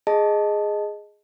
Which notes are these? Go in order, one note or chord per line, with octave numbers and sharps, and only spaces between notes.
G#4 D#5 A5